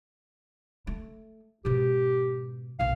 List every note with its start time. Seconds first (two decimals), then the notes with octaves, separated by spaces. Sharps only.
0.87 A3
1.65 G#2 B2 G4
2.79 B1 A#2 F5